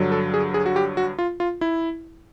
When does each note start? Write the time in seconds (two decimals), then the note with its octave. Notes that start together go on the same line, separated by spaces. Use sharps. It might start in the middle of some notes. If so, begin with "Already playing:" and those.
Already playing: G2 D3 F#3
0.12 A4
0.34 G#4
0.54 G#4
0.66 F#4
0.76 G4
0.97 F#4
1.19 F4
1.40 F4
1.61 E4